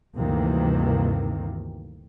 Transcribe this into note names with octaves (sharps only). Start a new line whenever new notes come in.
D2 G2 C3 D#3 E3 A#3